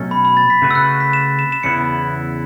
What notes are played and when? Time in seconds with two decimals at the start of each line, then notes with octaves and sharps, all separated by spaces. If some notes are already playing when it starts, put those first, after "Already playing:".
Already playing: B2 F#3 A3 C#4 A4
0.11 B5
0.25 B5
0.37 A6
0.50 B6
0.62 C#3 A3 F#4 B4
0.71 E6
0.75 F#6
1.00 B6
1.13 E7
1.39 E7
1.52 E7
1.63 E2 C#3 B3 E4 C#7